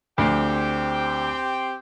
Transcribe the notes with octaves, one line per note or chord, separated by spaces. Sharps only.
D2 C4 G4 G5